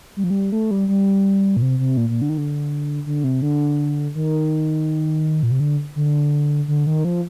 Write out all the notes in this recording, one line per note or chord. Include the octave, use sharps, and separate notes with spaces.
G3
F3
G3
A3
G3
G3
A#2
C3
C3
A#2
A#2
D3
D#3
D3
D3
C3
D3
D#3
A#2
C3
D3
D3
D3
D#3
F3